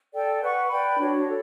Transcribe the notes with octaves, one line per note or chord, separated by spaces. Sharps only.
A4 D5 G5
B4 F#5 C#6
B4 D5 G5 B5
D4 F#4 C#5
A4